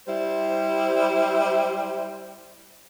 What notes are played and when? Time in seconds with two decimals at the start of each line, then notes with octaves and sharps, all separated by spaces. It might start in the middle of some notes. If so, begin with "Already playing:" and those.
0.07 G3 E4 C5